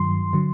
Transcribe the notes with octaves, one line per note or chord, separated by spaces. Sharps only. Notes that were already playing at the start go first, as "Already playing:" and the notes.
Already playing: G2 D#3 F#3 C6
D3 F#3